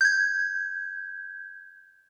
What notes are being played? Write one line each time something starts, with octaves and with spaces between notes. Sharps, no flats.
G6 G#6